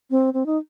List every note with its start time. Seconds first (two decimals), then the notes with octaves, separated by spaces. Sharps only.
0.10 C4
0.34 C4
0.46 D#4